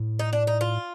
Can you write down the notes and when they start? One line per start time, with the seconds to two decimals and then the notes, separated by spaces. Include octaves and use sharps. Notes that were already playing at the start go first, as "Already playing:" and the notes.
Already playing: A2
0.19 D#4
0.33 D4
0.47 D#4
0.61 F4